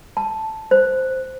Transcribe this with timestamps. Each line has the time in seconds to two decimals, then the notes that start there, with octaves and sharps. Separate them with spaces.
0.17 A5
0.71 C5